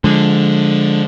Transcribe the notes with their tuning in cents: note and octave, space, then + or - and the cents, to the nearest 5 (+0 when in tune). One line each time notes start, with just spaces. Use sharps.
D3 +0 F3 +20 G#3 +0